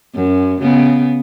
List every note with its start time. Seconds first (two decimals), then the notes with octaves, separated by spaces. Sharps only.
0.15 F#2
0.62 C#3 B3